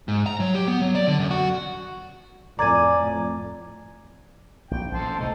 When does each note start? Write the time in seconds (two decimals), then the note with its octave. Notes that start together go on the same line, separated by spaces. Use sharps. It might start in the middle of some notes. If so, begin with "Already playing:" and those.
0.08 G#2
0.26 A#5
0.40 F#3
0.55 G4
0.68 B3
0.81 F#3
0.95 D5
1.08 D3
1.19 F#2
1.31 F#4
2.59 F2 A2 D5 G#5 A#5 G#6
4.71 A#1 G5
4.92 A1 A4 C5 A5
5.19 E1 C2 B2 D#4 A4